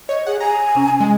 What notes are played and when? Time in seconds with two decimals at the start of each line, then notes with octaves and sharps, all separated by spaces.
0.09 C#5 D#5
0.27 G#4 F#5
0.40 G#5 A#5
0.75 C3 C#4
1.00 G#3